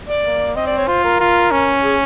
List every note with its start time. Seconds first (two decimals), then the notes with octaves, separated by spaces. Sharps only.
0.09 D5
0.24 A#3
0.55 C4 D#5
0.67 D5
0.77 C#5
0.87 F4 C5
1.04 A#4
1.20 F4
1.51 C#4
1.83 G#4